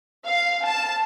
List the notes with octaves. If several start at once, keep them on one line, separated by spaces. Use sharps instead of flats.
F5
A5